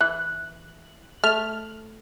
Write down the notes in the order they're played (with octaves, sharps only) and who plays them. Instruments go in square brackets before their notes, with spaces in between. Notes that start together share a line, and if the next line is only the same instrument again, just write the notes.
[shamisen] E3 [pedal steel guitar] F#6
[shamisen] A3 [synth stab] F6